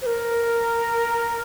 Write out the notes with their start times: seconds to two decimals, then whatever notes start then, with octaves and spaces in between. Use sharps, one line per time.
0.02 C5
0.06 A#4